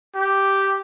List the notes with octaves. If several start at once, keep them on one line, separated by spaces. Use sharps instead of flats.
G4